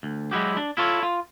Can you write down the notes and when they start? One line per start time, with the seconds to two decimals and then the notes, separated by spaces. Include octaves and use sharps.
0.03 D2
0.31 F#3 G#3 E4 F#4 G4
0.57 D4
0.77 E4 F4 A4 C#5
1.03 F4